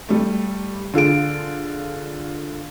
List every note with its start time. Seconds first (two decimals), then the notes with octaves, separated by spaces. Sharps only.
0.09 G3 A3
0.94 D3 F4 G#4 D7